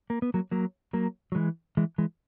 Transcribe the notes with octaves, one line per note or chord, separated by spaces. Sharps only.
A#3
B3
F#3 A#3
F#3 A#3
F#3 A#3
F#3
E3 G#3
E3 G#3
E3 G#3